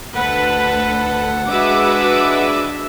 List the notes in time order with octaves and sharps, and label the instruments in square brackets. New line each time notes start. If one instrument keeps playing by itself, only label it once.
[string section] D2 A4 [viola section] B4 [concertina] F#5
[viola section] G#3 D4 E5 [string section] F#4 B4 D6